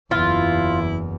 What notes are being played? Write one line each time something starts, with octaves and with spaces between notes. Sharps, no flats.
F#1 E2 E4 F4